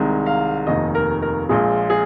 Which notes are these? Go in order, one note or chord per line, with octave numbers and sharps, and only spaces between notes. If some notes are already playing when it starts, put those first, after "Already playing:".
Already playing: C2 C3 D#3 G#3
F5
F1 D#2 D#3 D#5
A#4
A#4
A#1 A#2 F3 G#3 G#4
G#4